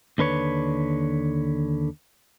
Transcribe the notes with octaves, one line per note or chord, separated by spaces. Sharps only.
D#2 D3 B4 C#5